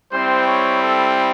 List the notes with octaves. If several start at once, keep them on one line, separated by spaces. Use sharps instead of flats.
G3 C4 E4 C5
C#5
A4